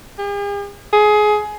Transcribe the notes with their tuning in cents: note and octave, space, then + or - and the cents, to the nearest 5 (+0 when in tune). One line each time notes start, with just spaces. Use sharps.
G#4 -45
G#4 +20